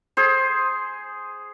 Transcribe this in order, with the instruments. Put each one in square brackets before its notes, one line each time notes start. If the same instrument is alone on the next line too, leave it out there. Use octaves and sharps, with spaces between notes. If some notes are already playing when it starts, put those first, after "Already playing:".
[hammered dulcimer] G#4 C5